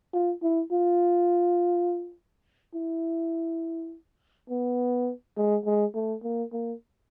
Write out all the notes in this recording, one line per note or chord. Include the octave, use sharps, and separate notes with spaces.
F4
E4
F4
E4
B3
G#3
G#3
A3
A#3
A#3